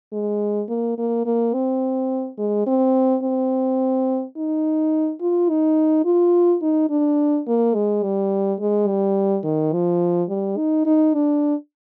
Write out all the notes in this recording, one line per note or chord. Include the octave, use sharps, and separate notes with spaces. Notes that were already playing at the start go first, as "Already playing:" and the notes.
G#3
A#3
A#3
A#3
C4
G#3
C4
C4
D#4
F4
D#4
F4
D#4
D4
A#3
G#3
G3
G#3
G3
D#3
F3
G3
D#4
D#4
D4